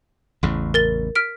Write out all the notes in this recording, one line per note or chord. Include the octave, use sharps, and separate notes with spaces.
A1 E2 C#3
A#4 A6 G7
F6 B6 D7